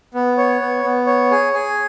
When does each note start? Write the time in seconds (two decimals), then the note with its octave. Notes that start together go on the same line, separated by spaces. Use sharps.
0.14 B3
0.38 C#5
0.61 B3
0.83 B3
1.07 C#5
1.31 G#4
1.53 G#4